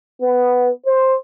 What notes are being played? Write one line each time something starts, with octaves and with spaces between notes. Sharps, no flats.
B3
C5